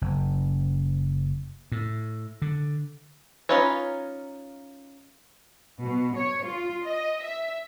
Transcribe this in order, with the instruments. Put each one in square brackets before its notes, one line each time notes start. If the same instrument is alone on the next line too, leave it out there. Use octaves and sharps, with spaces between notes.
[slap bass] F#1
A2
D3
[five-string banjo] C#4 D#4 F4 B4 C#5
[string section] B2
C#5
F4
D#5
E5